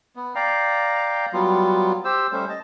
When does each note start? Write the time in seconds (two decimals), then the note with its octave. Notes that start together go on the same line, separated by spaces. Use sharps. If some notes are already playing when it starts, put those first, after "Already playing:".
0.16 B3
0.35 D5 F5 G5 A#5
1.33 F#3 G3 B3 F4
2.05 G4 C5 E6
2.32 G3 A3 C#4 C5
2.49 D#5 A5